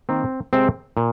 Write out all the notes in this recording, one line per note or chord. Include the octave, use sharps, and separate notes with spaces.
D#3 A#3 C4
C3 G#3 C4
A#2